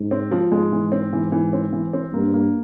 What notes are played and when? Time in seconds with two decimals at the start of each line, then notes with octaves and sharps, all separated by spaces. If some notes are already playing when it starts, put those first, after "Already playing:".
Already playing: G#2
0.11 C4
0.31 F3
0.52 G#2 G#3
0.72 E3
0.92 C4
1.13 E3
1.32 E3
1.53 C4
1.73 E3
1.93 C4
2.13 G2 A#3
2.34 A#3